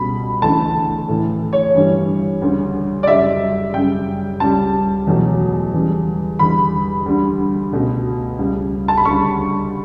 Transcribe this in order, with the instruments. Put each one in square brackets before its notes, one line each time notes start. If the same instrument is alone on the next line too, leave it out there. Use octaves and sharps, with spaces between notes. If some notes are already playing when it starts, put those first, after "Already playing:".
Already playing: [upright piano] C#2 B2 G3 B5
D2 C#3 E3 A3 A5
A2 E3 A3
C#5
G2 E3 G3
D2 C#3 G3
D5
F#2 C#3 G3 E5
F#2 C#3 G3 G5
C#2 C#3 G3 A5
E2 B2 F#3 A3
E2 C#3 G3
E2 D3 G3 B5
D2 D3 G3
C#2 B2 A3
C#2 C#3 G3
A5
B5
D2 C#3 G3 C#6